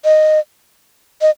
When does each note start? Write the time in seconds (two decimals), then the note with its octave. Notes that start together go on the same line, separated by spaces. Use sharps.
0.04 D#5
1.22 D#5